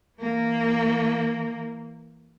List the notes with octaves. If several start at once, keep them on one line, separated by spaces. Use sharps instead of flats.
E3 A#3